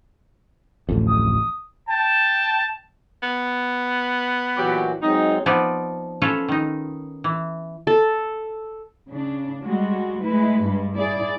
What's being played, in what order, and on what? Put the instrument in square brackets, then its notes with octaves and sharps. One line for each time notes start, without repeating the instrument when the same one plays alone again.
[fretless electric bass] D1 A1 F2
[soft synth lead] D#6
[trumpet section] G5 A5
[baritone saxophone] B3
[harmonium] A#2 E3 F#4 [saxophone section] F#3 G4
[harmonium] F#3 G#3 C4 [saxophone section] D#4
[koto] F3 B3 C4 D#4 D5
C#4 F4 A4 B4 C#5
D#3 D#4
E3
[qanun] A4
[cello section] C#3 D4
G3 G#3 F#4
G#3 A3 E4 B4
G2 G3 G#3
E4 G#4 D5